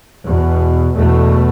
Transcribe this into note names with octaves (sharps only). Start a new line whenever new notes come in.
E2 B2
E2 B2 A3